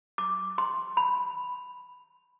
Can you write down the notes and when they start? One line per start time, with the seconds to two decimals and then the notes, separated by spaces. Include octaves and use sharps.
0.18 D6
0.58 C6
0.97 B5